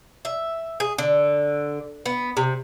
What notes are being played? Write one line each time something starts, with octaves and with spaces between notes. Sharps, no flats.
E5
G#4
D3
B3
C3